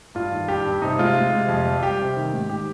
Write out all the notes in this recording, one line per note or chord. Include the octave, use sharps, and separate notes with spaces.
G2 F4
D#3
G2 G4
G2
C3 D#4
G#3 F4
G#3
C3
F2
G3
G3 G4
C3
D#3
G#2
D#3 G4